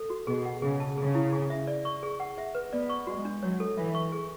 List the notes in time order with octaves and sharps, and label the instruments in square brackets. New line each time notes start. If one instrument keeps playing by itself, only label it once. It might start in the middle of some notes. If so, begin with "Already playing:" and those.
Already playing: [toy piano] A4
F#4
[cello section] B2 [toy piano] G#4
[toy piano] F#5
[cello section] C#3 [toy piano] G#4
[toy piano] A5
[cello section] C#3 [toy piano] G#4
[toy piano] E4
G#4
E5
D5
C#6
G#4
F#5
E5
B4
[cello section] B3 [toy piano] D5
[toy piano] C#6
[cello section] G#3 [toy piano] F#4
[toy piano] D4
[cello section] F#3 [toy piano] C#5
[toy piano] A4
[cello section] E3 [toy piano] E5
[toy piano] C#6
G#4